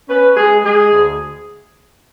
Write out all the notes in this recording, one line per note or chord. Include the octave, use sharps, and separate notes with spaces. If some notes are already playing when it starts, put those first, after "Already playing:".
C#4 B4
G#3 G#4
G#3 G#4
D2